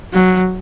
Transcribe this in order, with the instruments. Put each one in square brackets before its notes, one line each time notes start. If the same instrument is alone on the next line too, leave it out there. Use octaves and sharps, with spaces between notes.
[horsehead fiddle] F#3